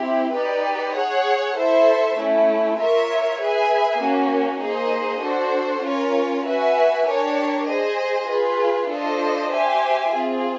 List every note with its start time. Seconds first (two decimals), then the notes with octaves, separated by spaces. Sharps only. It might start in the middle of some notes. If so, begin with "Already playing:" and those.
Already playing: C4 E4 G4
0.34 D#4 G4 B4 D5
0.96 G#4 C#5 F#5
1.56 E4 A4 C5 E5
2.18 A3 C#4 E4
2.79 F4 A#4 C#5 E5
3.40 G#4 B4 E5 G#5
4.02 A#3 C#4 F#4
4.62 A#3 D#4 G#4 C5 D#5
5.24 D4 F#4 A4 C5
5.84 C#4 F4 A#4 C#5
6.46 F#4 B4 E5 G#5
7.07 D4 G4 A#4 C#5
7.69 G#4 C5 D#5
8.30 F4 G#4 B4
8.91 D4 F4 A4 C5 D#5
9.52 G4 C5 E5 G#5
10.13 C4 F4 G#4